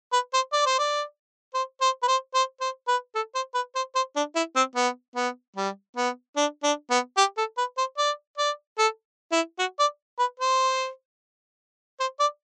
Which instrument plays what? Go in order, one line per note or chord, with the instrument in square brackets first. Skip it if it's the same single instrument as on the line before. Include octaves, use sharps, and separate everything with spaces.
[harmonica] B4
C5
D5
C5
D5
C5
C5
B4
C5
C5
C5
B4
A4
C5
B4
C5
C5
D4
E4
C4
B3
B3
G3
B3
D4
D4
B3
G4
A4
B4
C5
D5
D5
A4
E4
F#4
D5
B4
C5
C5
D5